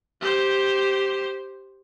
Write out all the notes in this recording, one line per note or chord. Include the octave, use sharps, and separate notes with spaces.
G4 C5